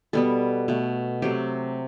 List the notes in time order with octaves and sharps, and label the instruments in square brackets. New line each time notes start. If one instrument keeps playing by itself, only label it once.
[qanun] B2 G3 B3 A4
B2 A3
C3 F#3 A3 G4